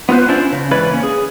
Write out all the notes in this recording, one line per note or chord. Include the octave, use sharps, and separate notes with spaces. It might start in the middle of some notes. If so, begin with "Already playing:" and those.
B3 F4 A4 B4 C5
C#4 D4 E4 F4 C5 D5
C#3
G#2 E3 B4 C#5 D5 B5
A#3 C#4
G#4